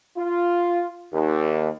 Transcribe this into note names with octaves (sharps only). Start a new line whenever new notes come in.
F4
D#2